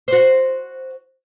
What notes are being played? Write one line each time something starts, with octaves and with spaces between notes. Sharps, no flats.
F#4 C5